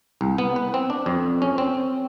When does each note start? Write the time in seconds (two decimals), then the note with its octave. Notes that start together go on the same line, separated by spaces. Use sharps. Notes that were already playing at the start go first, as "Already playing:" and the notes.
0.21 C2
0.38 B3
0.56 B4
0.74 C4
0.90 D4
1.06 F2
1.42 C#4
1.58 C4